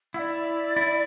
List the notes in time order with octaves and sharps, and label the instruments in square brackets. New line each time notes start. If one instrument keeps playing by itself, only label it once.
[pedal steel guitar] E4 [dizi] F#5
[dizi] D5
[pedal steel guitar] E4